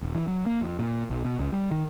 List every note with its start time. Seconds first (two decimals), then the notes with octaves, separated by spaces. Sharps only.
0.02 D#1
0.15 E3
0.27 F#3
0.46 A#3
0.61 F2
0.79 A#2
1.10 B1
1.24 B2
1.39 C#2
1.52 G3
1.71 D#3